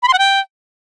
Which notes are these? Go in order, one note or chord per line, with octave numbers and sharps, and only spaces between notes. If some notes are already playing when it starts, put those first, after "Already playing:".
B5
C6
F#5
G5